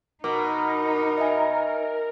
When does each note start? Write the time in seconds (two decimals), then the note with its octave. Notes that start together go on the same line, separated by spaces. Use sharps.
0.24 B2 D#4 A#4 D6
1.17 D#5 E5 G#5